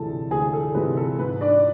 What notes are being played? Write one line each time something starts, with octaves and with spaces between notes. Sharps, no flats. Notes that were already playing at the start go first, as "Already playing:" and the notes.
Already playing: D2 C3 E3 G#3 A4 A5
D2 G#4 G#5
A4
C3 E3 G#3 B4
A4
G#2 B4
D4 D5